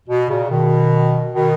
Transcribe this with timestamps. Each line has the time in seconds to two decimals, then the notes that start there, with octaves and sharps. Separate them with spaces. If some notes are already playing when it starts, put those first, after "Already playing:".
0.09 B2
0.29 A#2 C#3
0.50 B2 D#3
1.34 B2 D#3